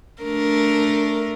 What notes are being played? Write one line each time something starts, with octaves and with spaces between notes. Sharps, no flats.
A3 D4 A#4